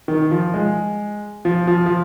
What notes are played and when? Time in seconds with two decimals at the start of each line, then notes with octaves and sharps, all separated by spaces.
0.08 D#3
0.31 F3
0.54 G#3
1.45 F3
1.67 F3
1.86 F3